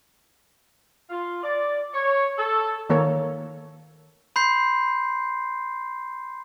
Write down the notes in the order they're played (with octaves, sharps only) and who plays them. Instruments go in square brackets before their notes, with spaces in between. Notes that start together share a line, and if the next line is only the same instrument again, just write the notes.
[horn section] F4
D5
C#5
A4
[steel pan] D#3 A#3 A4 A#4 C#5
[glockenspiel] B5 C6 G6 C7